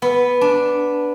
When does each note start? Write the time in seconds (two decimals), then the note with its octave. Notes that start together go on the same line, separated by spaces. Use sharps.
0.02 B3
0.41 D4